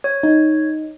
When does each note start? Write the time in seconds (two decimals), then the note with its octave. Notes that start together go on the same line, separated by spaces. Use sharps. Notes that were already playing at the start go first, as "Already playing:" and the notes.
0.04 C#5
0.23 D#4